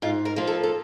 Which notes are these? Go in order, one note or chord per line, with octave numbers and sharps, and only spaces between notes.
G#2 F4
A#4
F3 A#3
A4
A4